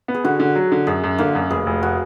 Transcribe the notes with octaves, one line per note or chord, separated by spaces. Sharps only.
B3
G#4
D3 F#4
D3
F#3
D3
F#2 G#4
F#2
D3 A#3
F#2
F1 G#4
F1
F#4